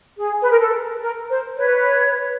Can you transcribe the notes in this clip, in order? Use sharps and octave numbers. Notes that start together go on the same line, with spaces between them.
G#4
B4
A#4
A4
A#4
C5
B4 C#5